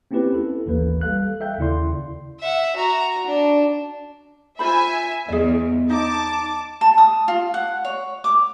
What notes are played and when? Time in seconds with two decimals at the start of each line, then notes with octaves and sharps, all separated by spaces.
0.11 A#3 C4 C#4 E4 G4 B4
0.34 E4 A4
0.66 G#1 D#2 E3 A#3 B4
1.01 G3 A4 F5 F#6
1.40 A4 E5 F5 G5 G6
1.58 D#2 C#3 E4 D5 C6
2.40 E5 F#5
2.76 F#4 A#5
3.27 D4
4.59 F4 C5 E5 G#5 B5
5.28 E2 G#4 D#5
5.90 D#4 D#5 A5 D6
6.81 A5
6.98 D#6
7.28 F4
7.54 F#5
7.85 C#5
8.24 D6